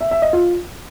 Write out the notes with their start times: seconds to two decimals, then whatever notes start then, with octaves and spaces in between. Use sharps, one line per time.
0.01 E5
0.11 E5
0.22 D#5
0.33 F4